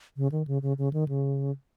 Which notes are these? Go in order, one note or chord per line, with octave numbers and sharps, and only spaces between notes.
C#3
D#3
C#3
C#3
C#3
D#3
C#3